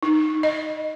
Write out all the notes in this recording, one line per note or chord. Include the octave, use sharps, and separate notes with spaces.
D#4
D#5